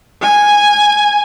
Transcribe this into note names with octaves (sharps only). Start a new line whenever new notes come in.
G#5